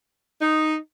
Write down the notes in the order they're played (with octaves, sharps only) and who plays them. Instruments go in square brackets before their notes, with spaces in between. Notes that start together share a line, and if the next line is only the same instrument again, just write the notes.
[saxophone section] D#4